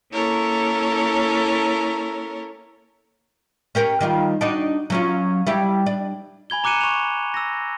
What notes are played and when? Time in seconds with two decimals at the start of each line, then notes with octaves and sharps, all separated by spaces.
0.11 A#3 C#4 E4 A4 A#4 C#5
3.75 C#4 G4 A#4
4.01 D#3 G3 F4
4.41 D4 D#4 F#4
4.90 F#3 C#4 F4
5.47 G3 E4 G4
5.86 D4
6.50 G#5 B5 G#6 G7
6.64 A#5 D6 F#6 C#7 D#7 E7
6.81 C#6 F7
7.34 E6 A#6